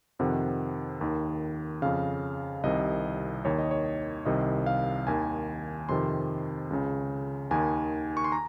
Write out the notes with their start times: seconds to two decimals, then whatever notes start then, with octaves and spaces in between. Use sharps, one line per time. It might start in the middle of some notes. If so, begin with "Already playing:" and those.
0.19 F2 C3 D#3 F#5
1.01 D#2 D#3
1.82 F2 C#3 F5
2.63 C2 C3 D#3 D#5
3.45 D#2 D#3 C#5
3.59 D#5
3.71 C#5
4.26 C2 C3 D#3 D#5
4.66 F5
5.07 D#2 D#3 G#5
5.89 F2 C3 D#3 C6
6.70 C#2 C#3
7.51 D#2 D#3 G#5
8.17 C#6
8.24 C6
8.32 A#5